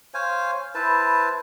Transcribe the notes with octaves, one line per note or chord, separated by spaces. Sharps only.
C5 C#5 F5 G#5
E4 B4 C5 A5